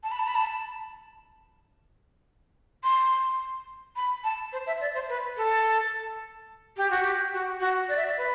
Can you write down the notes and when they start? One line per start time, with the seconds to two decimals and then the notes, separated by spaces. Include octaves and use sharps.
0.03 A5
0.12 B5
0.19 A5
0.28 B5
0.35 A5
2.84 C6
3.96 B5
4.24 A5
4.53 C5
4.67 E5
4.81 D5
4.94 C5
5.09 B4
5.37 A4
6.77 G4
6.90 F#4
7.02 G4
7.33 F#4
7.60 F#4
7.89 D5
7.97 E5
8.04 D5
8.17 B4